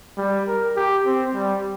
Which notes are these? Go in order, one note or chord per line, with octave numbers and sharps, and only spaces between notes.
G3
A#4
G4
C4
G3